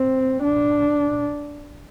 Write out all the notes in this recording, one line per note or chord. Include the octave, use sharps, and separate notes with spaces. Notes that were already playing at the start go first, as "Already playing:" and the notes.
Already playing: C4
D4